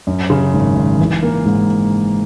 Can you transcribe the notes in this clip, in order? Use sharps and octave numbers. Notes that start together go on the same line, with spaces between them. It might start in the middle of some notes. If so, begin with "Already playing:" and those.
F#2
C#3
G#1
G#1
E3
A#3
G#2